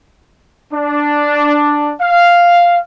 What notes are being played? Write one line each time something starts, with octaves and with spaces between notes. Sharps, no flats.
D4
F5